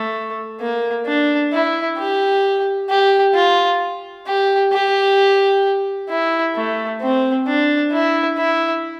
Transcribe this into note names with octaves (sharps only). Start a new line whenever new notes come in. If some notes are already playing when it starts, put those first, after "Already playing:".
Already playing: A3
A#3
D4
E4
G4
G4
F4
G4
G4
E4
A3
C4
D4
E4
E4